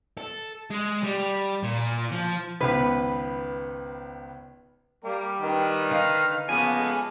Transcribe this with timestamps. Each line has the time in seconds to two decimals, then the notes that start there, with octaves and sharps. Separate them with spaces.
0.18 A4
0.71 G#3
1.04 G3
1.63 A#2
2.11 F3
2.61 G#1 C#2 B3 B4
5.04 G3 A#3 A#4
5.41 D#3 B4 G5
5.91 D3 D#4 D#5 F5
6.49 C#3 F3 A#3 B3 G#5
6.79 G#3 A4